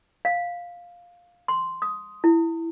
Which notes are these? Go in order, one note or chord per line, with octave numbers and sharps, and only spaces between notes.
F5
C6
D#6
E4